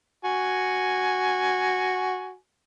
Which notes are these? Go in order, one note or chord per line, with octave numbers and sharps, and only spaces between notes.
F#4 G#5